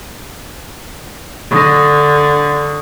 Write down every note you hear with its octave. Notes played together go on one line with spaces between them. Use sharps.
D3 C#6 D#6 A#6